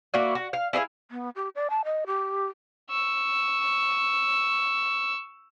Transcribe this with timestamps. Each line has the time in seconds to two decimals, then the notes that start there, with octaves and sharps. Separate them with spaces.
0.14 A#3 E4 F#4 D5
0.35 F#4
0.53 F5
0.73 E4 G#4 D#5 F5
1.11 B3
1.36 G4
1.55 D5
1.70 A5
1.85 D#5
2.07 G4
2.90 C#6 E6